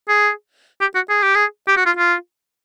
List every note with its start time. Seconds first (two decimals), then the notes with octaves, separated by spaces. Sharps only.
0.08 G#4
0.81 G4
0.95 F#4
1.09 G#4
1.22 G4
1.35 G#4
1.67 G4
1.76 F#4
1.86 F4
1.97 F4